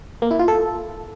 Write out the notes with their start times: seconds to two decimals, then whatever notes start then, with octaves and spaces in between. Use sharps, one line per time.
0.22 A#3
0.31 E4
0.39 F4
0.48 A4